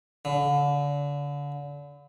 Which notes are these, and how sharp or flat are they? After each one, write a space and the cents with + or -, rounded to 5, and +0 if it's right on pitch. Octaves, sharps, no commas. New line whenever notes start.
D3 -35